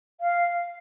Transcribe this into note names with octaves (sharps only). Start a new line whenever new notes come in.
F5